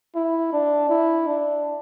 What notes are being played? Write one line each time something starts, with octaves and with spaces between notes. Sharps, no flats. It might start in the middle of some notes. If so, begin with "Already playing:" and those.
E4
D4
E4
D4